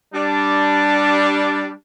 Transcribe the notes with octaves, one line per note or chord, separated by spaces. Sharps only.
G3 D4